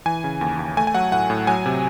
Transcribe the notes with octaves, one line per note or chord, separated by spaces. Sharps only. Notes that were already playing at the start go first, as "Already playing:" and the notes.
E3 G#5
C#3
D#2
D#2
A3 G#5
G#5
F#3 F#5
A2 F#5
A2
F#3 G#5
C3